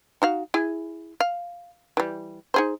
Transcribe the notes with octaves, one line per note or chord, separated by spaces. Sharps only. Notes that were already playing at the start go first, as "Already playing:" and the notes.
D#4 F#4 F5
E4 G#4 G#5
F5
E3 G3
D#4 G#4 C5